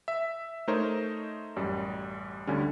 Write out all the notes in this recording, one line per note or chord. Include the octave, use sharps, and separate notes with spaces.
E5
A3 D#4 A#4 C5 C#5 D#5
A1 F#2 G3
D2 D3 G3 C#4